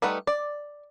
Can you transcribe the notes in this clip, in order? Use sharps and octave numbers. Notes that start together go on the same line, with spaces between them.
G3 A3 D#4 B4 F#5
D5